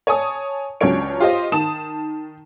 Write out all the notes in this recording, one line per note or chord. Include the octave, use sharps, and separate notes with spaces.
C#5 G#5 A5 D#6
C#2 F#3 C#4 D4 C#5 D7
F4 G4 C5 D#5
D#3 A5 D#6 E7